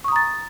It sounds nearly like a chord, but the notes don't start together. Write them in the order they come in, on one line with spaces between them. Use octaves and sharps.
C#6 D#6 A#5 A6